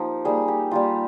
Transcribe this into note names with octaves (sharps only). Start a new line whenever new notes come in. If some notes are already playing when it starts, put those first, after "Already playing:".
Already playing: F3 A#3 D#4 G4
G3 A#3 D#4 G#4
G4
G3 A#3 D#4 F4